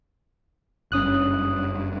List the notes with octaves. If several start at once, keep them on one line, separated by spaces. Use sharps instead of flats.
F#1 G2 C#4 D#6 F#6